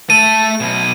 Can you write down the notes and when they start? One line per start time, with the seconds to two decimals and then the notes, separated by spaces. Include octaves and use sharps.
0.10 A3 A4 D#7
0.60 B1 B2